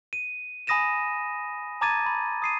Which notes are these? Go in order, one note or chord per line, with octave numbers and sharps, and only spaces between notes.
D#7
G#5 B5 D#6 A#6 D#7 E7
A5 A#5 D6 G#6 A6 D#7
B5
D#6 C7 D#7